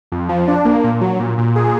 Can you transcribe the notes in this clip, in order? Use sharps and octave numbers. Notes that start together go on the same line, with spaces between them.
F2
F3
D4
A#3
A#2
F#3
A#2
A#2
G#4